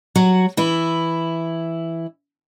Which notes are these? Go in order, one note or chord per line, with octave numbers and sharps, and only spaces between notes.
F#3 F#4
E3 E4